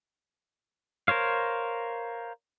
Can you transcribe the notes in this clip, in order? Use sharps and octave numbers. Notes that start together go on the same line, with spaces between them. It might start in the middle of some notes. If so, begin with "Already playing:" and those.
A#4 C5 C#5 F5